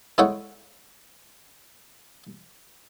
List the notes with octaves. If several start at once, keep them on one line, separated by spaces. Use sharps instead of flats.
G#3 E4 A4 C#5 F#5 G5